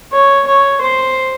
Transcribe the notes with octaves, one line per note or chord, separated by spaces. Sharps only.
C#5
C#5
C5